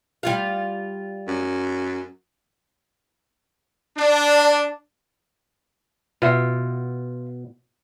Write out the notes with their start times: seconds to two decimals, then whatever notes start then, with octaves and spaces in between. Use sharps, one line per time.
0.23 G3 F4 F5
1.28 F#2
3.97 D4
6.22 B2 B3 F4 E5